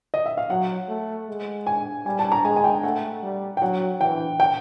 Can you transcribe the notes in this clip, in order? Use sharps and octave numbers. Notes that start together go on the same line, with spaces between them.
D#5
E5
F5
F#3 F#5
A3
G#3
G#5
G3 G#5
A5
A#5
G#3 G#5
G#5
G5
A3 F#5
G3
G5
F#3 F#5
E3 G5
G5